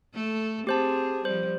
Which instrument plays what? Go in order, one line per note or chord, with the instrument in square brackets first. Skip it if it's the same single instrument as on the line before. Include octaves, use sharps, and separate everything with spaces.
[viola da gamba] A3 A4
[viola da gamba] C4 G#4 [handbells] G4 C5 A5
[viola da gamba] F3 G3 [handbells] C5